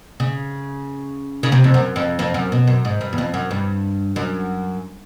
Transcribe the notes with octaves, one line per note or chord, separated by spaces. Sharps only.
C#3
C#3
C3
F2
F#2
F2
F2
F#2
B2
F#2
G#2
G2
E2
F2
F#2
G2
F#2